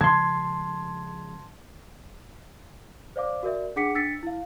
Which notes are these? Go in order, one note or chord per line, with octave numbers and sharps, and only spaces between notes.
C#3 F3 G#3 A5 C6 G#6
C5 D5 F5 D6
F#4 A#4 D5 E5
D4 G#4 F#5 D6 B6 C#7
D4 E6 A6 B6 C#7
E4 F5